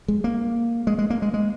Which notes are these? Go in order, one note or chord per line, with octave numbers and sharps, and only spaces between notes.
G#3
A#3
G#3
G#3
A#3
G#3
G#3